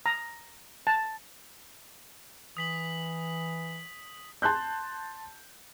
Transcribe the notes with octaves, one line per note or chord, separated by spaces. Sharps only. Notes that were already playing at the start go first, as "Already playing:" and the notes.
A#5
A5
E3 D#6 B6 F#7
A5 C6 F#6 G6